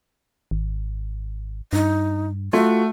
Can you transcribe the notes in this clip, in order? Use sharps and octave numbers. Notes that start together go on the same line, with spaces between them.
G#1
G2 D#4
A3 F4 F#4